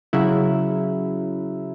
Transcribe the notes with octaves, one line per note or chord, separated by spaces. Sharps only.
C#3 F#3 E4